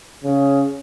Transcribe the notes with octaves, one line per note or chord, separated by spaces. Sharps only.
C#3